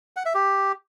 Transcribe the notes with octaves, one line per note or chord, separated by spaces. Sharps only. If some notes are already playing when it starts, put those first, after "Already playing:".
F#5
E5
G4